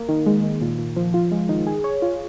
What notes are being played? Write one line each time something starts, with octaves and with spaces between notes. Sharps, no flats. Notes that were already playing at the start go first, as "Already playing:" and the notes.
Already playing: A#3
D#3
G#3
D#3
A#2
A#2
F3
F4
G#3
D#3
G#4
C#5
F4